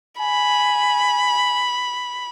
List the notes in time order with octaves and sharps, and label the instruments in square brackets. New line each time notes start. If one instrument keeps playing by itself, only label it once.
[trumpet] G#5 [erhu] B5